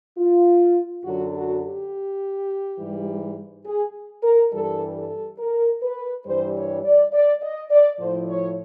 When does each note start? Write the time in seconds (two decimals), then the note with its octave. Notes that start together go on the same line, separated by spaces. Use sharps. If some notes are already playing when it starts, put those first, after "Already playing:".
0.18 F4
1.05 F#2 D3 F#3 F#4
1.34 F#4
1.63 G4
2.79 G#2 E3 G3
3.66 G#4
4.23 A#4
4.53 G2 E3 G3 A4
4.95 A4
5.39 A#4
5.83 B4
6.27 G2 E3 G3 C5
6.55 C#5
6.84 D5
7.13 D5
7.42 D#5
7.71 D5
8.00 A2 F3 C5
8.29 C#5